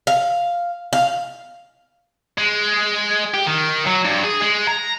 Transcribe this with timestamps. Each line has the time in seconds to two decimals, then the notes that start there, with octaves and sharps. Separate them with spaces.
0.07 F5
0.93 F5
2.38 G#3
3.34 G4
3.46 D#3
3.86 F#3
4.05 G2
4.23 G#4
4.41 G#3
4.67 A#5